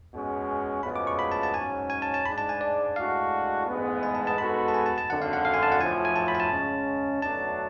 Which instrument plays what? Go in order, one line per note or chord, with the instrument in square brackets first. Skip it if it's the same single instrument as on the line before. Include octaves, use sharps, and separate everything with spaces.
[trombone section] B2 G#3 C#4
[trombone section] D2 C#3 F3 G#3 B3 [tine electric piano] B5
[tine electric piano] D6
C#6
B5
A5
A5
[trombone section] G#2 F#3 C#4 [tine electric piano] G#5
[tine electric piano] G#5
A5
A5
[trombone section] G#2 G#3 D4 [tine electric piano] B5
[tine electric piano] A5
G#5
D5
[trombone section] A2 G#3 D4 F#4 [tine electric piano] F5
[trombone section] A1 G#2 G#3 B3
[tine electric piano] G#5
A5
A5
[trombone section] G#2 G#3 B3 F#4 A4 [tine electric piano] B5
[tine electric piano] A5
G#5
A5
A5
[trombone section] G#1 F#2 D3 [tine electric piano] F#5
[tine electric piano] F5
F#5
F5
G#5
A5
F#5
[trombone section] B1 A2 F3 [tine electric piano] G#5
[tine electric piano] G#5
A5
B5
G#5
A5
[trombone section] C#3 G#3 C#4
[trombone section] B1 B2 F#3 A3 D4 [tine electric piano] A5